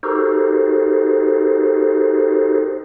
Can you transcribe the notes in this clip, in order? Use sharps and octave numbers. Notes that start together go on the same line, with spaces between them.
D#4 F#4 G4 A4 A#4 C5